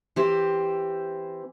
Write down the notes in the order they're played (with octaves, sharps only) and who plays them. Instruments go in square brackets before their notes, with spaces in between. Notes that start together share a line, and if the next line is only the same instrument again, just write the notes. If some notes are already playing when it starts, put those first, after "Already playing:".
[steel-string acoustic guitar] E3 C4 G4 C5